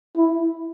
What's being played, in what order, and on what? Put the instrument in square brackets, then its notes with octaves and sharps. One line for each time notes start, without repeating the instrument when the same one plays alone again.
[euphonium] E4